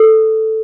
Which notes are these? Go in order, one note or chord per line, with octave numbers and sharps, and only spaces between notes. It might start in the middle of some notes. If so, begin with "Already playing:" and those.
Already playing: A4